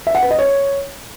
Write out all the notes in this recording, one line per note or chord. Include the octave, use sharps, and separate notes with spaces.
E5
F#5
B4
D#5
C#5